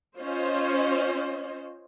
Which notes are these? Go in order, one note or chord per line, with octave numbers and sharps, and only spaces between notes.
C#4 F4 C5 C#5 D#5